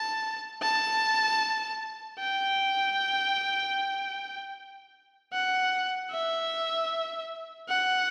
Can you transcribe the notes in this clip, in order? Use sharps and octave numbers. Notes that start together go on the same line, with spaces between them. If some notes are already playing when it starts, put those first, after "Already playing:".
Already playing: A5
A5
G5
F#5
E5
F#5